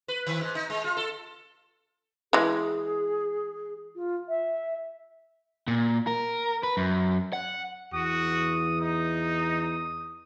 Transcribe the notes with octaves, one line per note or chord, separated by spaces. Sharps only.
B4
D#3
G#2
D#4
G#3
F4
A4
E3 G#3 G#4
F4
E5
A#2
A#4
B4
F#2
F#5
E2 F#4 D#6
D#4 D#6